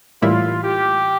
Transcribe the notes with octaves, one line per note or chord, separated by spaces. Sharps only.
A2 E3 G3 A#3 E4 F4
G4